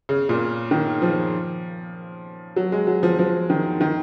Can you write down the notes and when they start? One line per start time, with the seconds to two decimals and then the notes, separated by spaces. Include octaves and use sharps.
0.09 C#3
0.29 A#2
0.71 D#3
1.02 F3
2.56 F#3
2.72 G#3
2.87 F#3
3.03 F3
3.19 F3
3.50 D#3
3.81 D#3